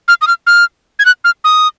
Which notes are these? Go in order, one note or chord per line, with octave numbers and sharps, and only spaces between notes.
F6
D#6
F6
F6
G#6
F#6
F6
D#6